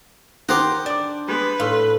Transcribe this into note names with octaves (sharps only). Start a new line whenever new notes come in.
D#3 G4 C5 F#5 A#5
D4 D5 D6
G3 G#3 B3 B4
A2 F5 C6